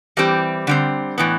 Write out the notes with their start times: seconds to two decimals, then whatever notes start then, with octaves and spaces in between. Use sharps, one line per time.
0.17 E3 G3 C4 G4
0.67 D3 G3 C4
1.18 A2 E3 B3